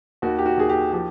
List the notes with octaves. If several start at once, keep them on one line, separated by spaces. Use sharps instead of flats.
D#2 F#4
G4
F#4
D#2 G#4
G4
F3 G4